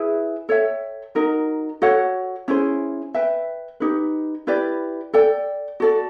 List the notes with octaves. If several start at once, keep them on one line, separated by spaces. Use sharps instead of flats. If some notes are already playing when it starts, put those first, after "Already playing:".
Already playing: E4 G#4 B4 E5
A4 C#5 E5 G5
D#4 F#4 A#4 D#5
F#4 A4 C#5 F#5
C#4 E4 G#4 C5
B4 E5 G5
D#4 G4 B4
E4 G4 B4 D5
A4 D5 G5
F#4 A4 D5